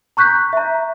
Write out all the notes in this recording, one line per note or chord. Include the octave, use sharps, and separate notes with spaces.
A#5 C#6 F#6 G6 B6
E5 A#5